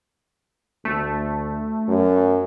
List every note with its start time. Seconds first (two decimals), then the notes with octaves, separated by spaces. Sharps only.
0.85 D2 A3
1.88 F#2